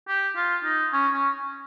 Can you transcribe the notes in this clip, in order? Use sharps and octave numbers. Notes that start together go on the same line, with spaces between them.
G4
F4
D#4
C#4
C#4